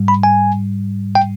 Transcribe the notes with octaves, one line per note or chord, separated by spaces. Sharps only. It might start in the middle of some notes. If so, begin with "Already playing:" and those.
Already playing: G#2 G3
B5
G#5
G5